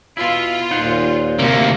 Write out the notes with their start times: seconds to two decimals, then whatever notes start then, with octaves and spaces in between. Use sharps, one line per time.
0.17 B2 E4 F4
0.71 D#2 A#2 D#4 C5 F#5
1.39 D2 C3 A#3